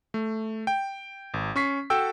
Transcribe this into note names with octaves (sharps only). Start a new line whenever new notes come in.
A3
G5
G#1
C#4 C#6 B6 C7
F#4 A4 G5 A5 E6